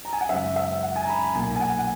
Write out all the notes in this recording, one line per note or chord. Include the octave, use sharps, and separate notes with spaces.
A#5
G#5
F#5
F#2 C#3 G#3 E5
E5
E5
F#5
G#5
A#5
B5
A#5
B1 A#2 A#3 G#5
G#5
F#5
F#5